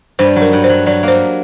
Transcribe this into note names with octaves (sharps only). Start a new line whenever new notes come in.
G2 C5
F#3
A#4
G2
C5
F#3
F#3 D5
A#3 C5